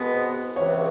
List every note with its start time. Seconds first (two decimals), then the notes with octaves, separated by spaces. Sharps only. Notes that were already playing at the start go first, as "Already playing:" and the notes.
Already playing: C2 B2 G#3 B3 B4
0.14 C5
0.56 C#2 C3 E3 C#5